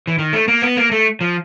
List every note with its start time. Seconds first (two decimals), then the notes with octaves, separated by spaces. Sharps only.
0.07 E3
0.19 D#3
0.33 A3
0.48 A#3
0.62 B3
0.77 A#3
0.91 A3
1.21 F3